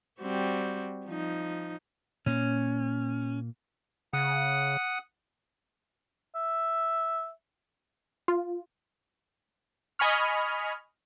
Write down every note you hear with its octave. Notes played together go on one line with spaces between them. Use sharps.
G3 C4 F#4
F3 D#4
A#2 A#3 C#4
C#3 F#5 D#6
E5
F4
D#5 G#5 B5 C#6 F6